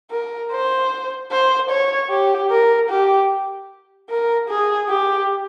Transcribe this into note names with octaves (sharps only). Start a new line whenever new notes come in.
A#4
C5
C5
C#5
G4
A#4
G4
A#4
G#4
G4